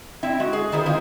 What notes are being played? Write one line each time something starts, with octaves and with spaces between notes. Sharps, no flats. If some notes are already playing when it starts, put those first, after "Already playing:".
C4 D4 E4 E5
G#3 F#4
G#4
D#3 E4 G#4 C5
D#3 G#3 C4 F4 C5